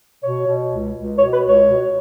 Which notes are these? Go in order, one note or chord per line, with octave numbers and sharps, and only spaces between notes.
B2 C#5
B2
C#2
C#2
B2 C#5
B4
C#2
C#5
B2